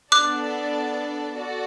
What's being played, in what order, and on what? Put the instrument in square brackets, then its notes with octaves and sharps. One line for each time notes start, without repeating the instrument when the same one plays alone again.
[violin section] B3 D4 A4 D5 A5 [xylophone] D6 F#6
[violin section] F#4 A4 D5